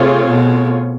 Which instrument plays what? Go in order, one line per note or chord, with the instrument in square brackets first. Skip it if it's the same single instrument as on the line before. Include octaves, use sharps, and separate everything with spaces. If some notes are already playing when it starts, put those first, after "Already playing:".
Already playing: [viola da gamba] C3 [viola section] A3 C4 F4 G#4 C#5
[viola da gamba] B2